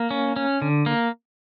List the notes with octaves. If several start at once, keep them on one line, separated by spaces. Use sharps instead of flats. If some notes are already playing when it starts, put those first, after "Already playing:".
Already playing: A#3
C#4
C#4
D3
A#3